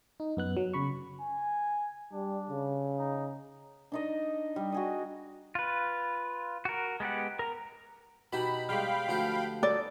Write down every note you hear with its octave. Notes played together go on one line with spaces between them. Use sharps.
D#4
F#2 B3 F#6
F#3
C#3 B5 C#6
G#5
G3 D4
C#3
D#4
D4 D#4 D#5
G3
F#4 G#4 D#5
F4 B4
F#4 A#4
G#3 B3 G4 F#5
A#4 A#5
B2 D#4 F#4 G4 A5 B5
G3 G#3 G4 F5 G5 B5
D2 F3 F#4 G4
B3 D#4 A4 D5